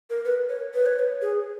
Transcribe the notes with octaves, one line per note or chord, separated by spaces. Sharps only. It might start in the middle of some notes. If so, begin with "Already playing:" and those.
A#4
B4
C#5
B4
C#5
B4
G#4